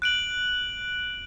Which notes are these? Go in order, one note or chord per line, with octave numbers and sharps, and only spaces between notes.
F#6 D7 F#7